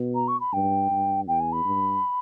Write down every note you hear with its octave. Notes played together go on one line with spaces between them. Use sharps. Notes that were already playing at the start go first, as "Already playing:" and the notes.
Already playing: B2
A#5
C#6
B5
G2 G5
G2
E2 G5
G#5
B5
G2